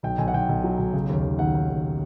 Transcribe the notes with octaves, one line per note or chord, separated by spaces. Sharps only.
B1 G5
B1 G#5
F#5
B1 G5
B1
F#3
B1
C#3
D#2
D#2
D#2 F#5
D#2
D#2